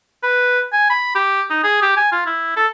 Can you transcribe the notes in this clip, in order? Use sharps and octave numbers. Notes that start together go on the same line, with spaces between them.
B4
G#5
B5
G4
D#4
G#4
G4
G#5
F4
E4
A4